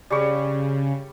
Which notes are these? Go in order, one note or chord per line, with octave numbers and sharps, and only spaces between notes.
C#3 G3 C#6